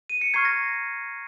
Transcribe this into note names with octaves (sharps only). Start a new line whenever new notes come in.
D#7
C#7
A#5 C#6 F6 G#6 C7
A#6